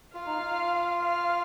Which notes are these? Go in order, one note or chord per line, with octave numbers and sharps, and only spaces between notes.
F4 F5
D#4
F4
F5